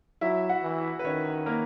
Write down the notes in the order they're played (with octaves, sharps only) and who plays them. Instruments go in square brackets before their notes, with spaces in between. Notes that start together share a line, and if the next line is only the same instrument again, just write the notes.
[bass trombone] F#3 [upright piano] E4 E5
[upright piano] F#4 F#5
[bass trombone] E3
[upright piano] B4
[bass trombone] D#3 [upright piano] C#4 C#5
[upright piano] A#3 A#4